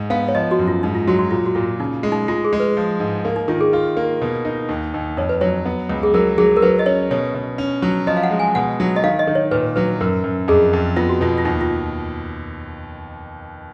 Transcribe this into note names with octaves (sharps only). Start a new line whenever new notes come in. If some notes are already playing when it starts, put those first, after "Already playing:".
Already playing: G#2
B3 F5
C#5
F3 D#5
F#4
F#2
F4
G#2 D#4
F4
F#3 F#4
F#4
A#2 F4
F#4
A#2 F4
C#3 D#4
G#3
D#4
G#3 F4
G#4
G#3
B4
F3
G#2
A#3
D#4
D#3 F4
G#4
F4
A#3
B2
D#4
D#2
D#2
F2 C#5
B4
F#3 C#5
B3
C#2
G#4
F#3 A#4
F#3 G#4
A#4
F#3 B4
D#5
C#4 C#5
B2 C#5
B2
C#4
F#3
F3 D#5
F5
F#5
G#3
G#5
B2 F#5
F#3
D#5
D#3 F5
D#5
D#3
C#5
A#2 B4
F#3 B4
F#2 A#4
F#2
F2 G#4
F2
B3 F4
F#4
B2 F4
F4
D#2 D#4
F4